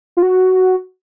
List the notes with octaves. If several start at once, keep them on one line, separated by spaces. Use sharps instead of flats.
F4
F#4